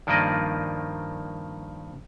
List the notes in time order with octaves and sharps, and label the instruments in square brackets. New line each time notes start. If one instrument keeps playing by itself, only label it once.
[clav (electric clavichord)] G2 D#3 F3 A#3 D5 D#5